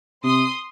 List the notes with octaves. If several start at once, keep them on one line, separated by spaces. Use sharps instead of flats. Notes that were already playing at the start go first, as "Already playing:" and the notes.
C3 C6 D#6